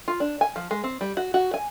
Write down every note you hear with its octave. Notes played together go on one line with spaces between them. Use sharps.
F4
D4
G#5
F3
G#3
C4
G3
F#4
F#4
G#5